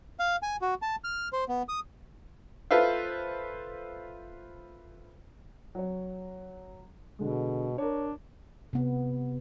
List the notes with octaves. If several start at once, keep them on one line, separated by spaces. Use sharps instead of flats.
F5
G#5
F#4
A5
F6
C5
B3
D#6
F4 A4 B4 C5 E5 F5
F#3 C#5
B2 D3 G#3
D4 A#4 C#5
C3 B3